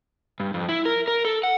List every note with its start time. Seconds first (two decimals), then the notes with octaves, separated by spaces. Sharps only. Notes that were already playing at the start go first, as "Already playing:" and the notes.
0.40 G2
0.54 F2
0.69 E4
0.85 A#4
1.08 A#4
1.25 A4
1.43 F#5